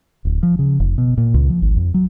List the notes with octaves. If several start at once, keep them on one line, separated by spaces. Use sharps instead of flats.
D1
F3
C#3
F1
B2
A#2
C#2
F3
G#1
F2
F#3